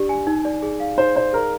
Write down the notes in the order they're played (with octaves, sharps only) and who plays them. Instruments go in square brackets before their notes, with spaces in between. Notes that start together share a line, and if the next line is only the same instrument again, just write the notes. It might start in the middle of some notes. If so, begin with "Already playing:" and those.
Already playing: [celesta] D4 G4 D5
G#5
D#4
D5
G#4
F5
[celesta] D#4 [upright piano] C5
[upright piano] C5 [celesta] D5
[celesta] G#4 [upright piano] A#4